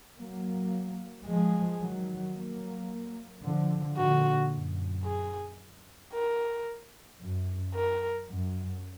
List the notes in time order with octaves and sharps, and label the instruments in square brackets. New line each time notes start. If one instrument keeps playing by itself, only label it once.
[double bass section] F#3 A#3
[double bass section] F3 G#3 [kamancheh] G#4
[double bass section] D#3 F#3
F#3 A#3
D3 F3
[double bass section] A#2 D3 [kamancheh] F#4
[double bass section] F#2
[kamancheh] G#4
A#4
[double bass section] F#2
[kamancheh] A#4
[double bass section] F#2